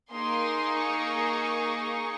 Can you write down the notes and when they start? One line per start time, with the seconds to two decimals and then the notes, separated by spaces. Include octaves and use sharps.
0.11 A#3 D#4 G#4 C6
0.77 C#6